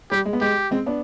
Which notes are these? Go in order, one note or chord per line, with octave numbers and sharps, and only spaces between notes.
G3 G4
G#3
B3
G#3 G4
G#3 C4
B3 D4